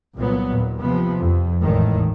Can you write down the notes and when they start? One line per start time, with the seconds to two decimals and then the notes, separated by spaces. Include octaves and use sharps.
0.18 C2 A#2 F#3 B3
0.51 D#2 A#2
0.80 C3 F3 B3
1.18 F2
1.62 G#1 E2 A2 D#3